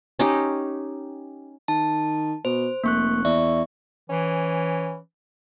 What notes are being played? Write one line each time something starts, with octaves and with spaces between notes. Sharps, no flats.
C#4 D#4 G4
D#3 A5
B2 C5
F1 A#3 C#6 F#6
E2 D5 E5 C#6
E3 C#4